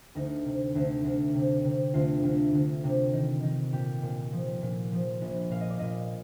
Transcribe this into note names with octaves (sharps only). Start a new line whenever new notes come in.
D2 D#4
C3
D2
D2
C3
C3
D2 F4
D2
D2
C3
D#3
D#3
A#2 G4
A#2
F3
A#2
F3
A#1
A#2 F5
D#5
D5
A#2 D#5